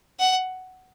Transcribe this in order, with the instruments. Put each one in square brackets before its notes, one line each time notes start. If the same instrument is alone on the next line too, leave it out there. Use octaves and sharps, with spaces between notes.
[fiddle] F#5